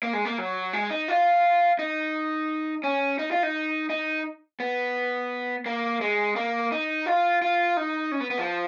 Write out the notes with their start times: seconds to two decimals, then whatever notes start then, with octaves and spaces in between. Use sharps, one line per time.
0.03 A#3
0.13 G#3
0.25 A#3
0.38 F#3
0.73 G#3
0.91 D#4
1.08 F4
1.79 D#4
2.84 C#4
3.19 D#4
3.31 F4
3.43 D#4
3.90 D#4
4.60 B3
5.66 A#3
6.01 G#3
6.36 A#3
6.72 D#4
7.06 F4
7.42 F4
7.77 D#4
8.12 C#4
8.20 B3
8.30 B3
8.38 F3